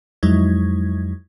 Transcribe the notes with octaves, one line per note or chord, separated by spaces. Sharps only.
F2 F#3 G#3 D#4 E4 G#6